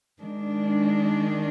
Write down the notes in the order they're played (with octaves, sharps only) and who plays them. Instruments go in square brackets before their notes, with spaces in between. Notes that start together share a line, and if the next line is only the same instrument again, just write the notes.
[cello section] D#3 G#3 D4